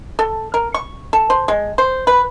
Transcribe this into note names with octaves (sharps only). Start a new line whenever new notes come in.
A4
A#4
C#6
A4
C5
G#3
C5
B4